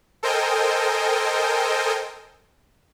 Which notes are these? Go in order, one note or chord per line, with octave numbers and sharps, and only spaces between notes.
A4 A#4 C5 D#5 G5 G#5